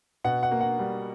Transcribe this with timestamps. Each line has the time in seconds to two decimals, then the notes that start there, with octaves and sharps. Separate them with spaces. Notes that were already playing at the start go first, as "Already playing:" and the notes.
0.24 B2 F#5
0.43 F#5
0.51 A#3
0.61 F#5
0.79 G3